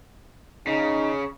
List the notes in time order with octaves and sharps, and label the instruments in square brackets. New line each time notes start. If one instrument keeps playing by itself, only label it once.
[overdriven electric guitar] C#3 [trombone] D#4